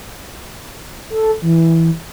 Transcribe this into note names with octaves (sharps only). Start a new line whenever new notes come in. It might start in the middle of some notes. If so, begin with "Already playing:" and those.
A4
E3